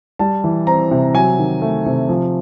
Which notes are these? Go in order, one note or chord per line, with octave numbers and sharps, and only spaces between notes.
G3 A5
E3
C4 A#5
C3
F#3 G#5
D#3
A3
C3
F3